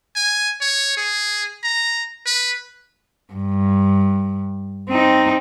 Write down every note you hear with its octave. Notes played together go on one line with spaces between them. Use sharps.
G#5
C#5
G#4
A#5
B4
G2
C4 D#4